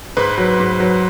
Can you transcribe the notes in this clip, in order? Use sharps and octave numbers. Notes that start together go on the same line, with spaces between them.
G#2 B4
F#3
G#2
F#3